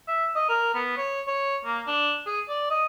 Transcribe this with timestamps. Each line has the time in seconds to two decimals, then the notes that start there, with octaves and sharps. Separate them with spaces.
0.08 E5
0.35 D#5
0.49 A#4
0.74 B3
0.97 C#5
1.27 C#5
1.65 A#3
1.87 D4
2.26 G#4
2.48 D5
2.70 D#5